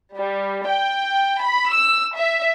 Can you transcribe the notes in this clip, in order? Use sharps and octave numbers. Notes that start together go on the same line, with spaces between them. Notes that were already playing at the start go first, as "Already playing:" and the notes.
G3
G5
B5
E6
E5